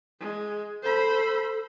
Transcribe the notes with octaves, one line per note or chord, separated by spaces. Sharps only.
G#3
A4 C5 B5